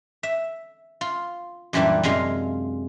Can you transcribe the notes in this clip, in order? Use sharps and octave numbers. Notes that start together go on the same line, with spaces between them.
E5
F4
F#2 A#2 E3 G3 D4 E4
F#2 C3 G#3 F4 F5